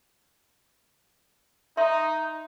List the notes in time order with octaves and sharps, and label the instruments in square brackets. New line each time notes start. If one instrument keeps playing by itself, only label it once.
[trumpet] D#4 [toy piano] E5 C6